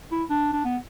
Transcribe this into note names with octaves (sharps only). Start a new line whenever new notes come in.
E4
D4
D4
B3